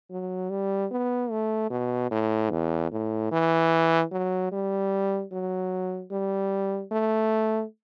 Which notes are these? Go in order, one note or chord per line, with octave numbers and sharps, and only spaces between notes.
F#3
G3
B3
A3
B2
A2
E2
A2
E3
F#3
G3
F#3
G3
A3